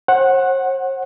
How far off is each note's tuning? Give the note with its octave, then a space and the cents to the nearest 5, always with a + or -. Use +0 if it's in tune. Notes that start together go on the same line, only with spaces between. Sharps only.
C5 +45 F#5 +0